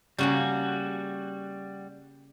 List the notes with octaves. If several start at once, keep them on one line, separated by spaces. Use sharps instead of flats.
C#3 G3 A#3 F#4 G#4